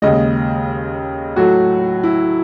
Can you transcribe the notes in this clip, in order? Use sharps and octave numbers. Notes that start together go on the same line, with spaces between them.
D#2 C#3 G#3 D#5
A2 F#3 A3 F#4
E4